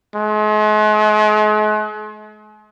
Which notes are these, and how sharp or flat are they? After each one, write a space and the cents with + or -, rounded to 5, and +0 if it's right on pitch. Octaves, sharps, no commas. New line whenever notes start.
G#3 +40